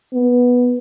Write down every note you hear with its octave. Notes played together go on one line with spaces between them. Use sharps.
B3